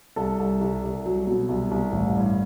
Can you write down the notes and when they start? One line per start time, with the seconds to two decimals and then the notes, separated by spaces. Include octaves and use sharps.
0.16 C2 A4
0.39 C2
0.61 C2
0.84 C2
1.06 F#3
1.27 B2
1.49 C2
1.71 C2
1.93 A1
2.16 G2